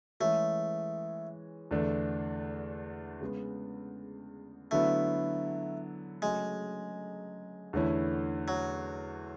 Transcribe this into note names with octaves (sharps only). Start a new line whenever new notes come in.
E3 G#3 A3 C#4 G#4 C#5
E2 D3 A3 D4
C#3 G#3 B3
D3 F#3 A3 B3 E4
C#3 F#3 G#3 A3
E2 D3 A3 C#4 E4
F#3